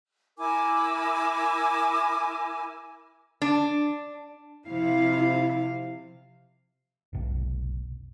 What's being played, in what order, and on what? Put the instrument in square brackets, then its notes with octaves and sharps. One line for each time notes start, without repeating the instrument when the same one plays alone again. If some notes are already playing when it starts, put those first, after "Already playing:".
[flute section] E4 A#4 G#5 D6
[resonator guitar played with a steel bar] D4
[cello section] C3 F3 F5 [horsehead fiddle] E4
[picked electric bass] F1 B1